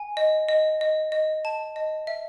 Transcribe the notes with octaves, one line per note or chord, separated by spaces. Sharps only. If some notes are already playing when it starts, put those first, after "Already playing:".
Already playing: G#5
D#5
D#5
D#5
D#5
A5
D#5
E5